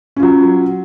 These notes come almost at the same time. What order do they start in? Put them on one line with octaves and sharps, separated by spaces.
C#4 F4 F#3